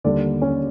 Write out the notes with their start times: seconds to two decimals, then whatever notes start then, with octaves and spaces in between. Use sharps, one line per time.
0.04 D#2 D3 G3 D4 D5
0.42 C#4 C#5